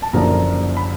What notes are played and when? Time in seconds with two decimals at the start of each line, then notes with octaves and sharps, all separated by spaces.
0.02 A5
0.13 F#1 F#2 D3 F3 A#3 A#5
0.77 B5